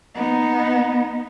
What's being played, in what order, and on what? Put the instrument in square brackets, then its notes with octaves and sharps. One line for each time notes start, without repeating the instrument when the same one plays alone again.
[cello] B3 D#4